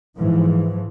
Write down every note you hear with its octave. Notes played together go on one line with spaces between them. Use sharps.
G#2 E3 F3